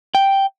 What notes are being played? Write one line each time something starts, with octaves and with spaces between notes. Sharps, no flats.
G5